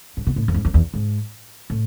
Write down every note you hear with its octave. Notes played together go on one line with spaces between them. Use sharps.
G#2
B2
A2
F2
G#2
F2
E2
G#2
A2